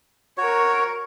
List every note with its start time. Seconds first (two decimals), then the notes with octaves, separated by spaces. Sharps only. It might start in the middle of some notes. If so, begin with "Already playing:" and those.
0.38 F#4 A#4 C#5 C#6